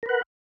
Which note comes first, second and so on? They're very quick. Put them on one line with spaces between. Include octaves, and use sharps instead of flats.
A#4 B4 F#5